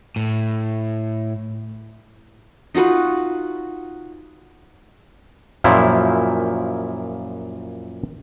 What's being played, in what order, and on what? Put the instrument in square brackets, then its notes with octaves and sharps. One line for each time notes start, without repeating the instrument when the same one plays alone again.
[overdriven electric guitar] A2
[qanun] D#4 F4 F#4 B4
[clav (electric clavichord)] F#2 A#2 F3 E4